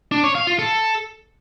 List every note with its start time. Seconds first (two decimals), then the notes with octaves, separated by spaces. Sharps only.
0.12 D4
0.23 C#5
0.35 F5
0.47 F4
0.59 A4